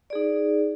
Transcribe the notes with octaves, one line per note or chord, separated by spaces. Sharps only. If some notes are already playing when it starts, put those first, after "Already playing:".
D#4 G#4 D5